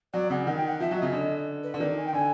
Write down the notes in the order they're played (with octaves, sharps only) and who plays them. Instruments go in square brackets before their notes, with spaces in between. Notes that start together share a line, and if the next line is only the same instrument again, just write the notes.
[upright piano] F#3 [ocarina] D5
[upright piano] C#3 [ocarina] F#5
[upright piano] D#3 [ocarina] F#5
[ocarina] G5
F#5
[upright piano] F3 [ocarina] E5
[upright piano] F#3
[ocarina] D#5
[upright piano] C#3
D3
[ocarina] B4
[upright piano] D3
[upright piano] D#3 [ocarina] D5
[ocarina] G#5
G5
[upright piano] D3 [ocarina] G#5